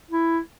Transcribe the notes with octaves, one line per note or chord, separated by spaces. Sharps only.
E4